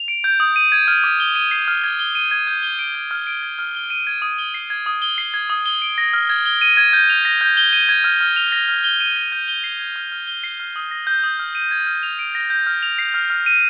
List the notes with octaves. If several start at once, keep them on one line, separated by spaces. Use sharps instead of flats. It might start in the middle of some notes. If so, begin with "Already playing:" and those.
Already playing: F7
D7
G6
D#6
D#7
G#6
F6
D6
G7
D#7
C7
F6
G#6
G7
D#7
G#6
G6
G7
D7
G6
F6
D7
G#6
F6
G7
D#7
G#6
D#6
G7
C7
G#6
D#6
G7
C7
G#6
D#6
G7
D7
A#6
F6
G#6
G7
D#7
G#6
G6
F7
A#6
G6
G7
D#7
G#6
F6
F6
F7
A#6
F6
G7
D#7
A#6
G6
G7
C7
G#6
F6
F6
G7
C7
F6
D#6
A#6
G6
D#6
F6
D#7
G#6
F6
F7
D7
A#6
G6
F6
F7
C7
F6
F6
D#7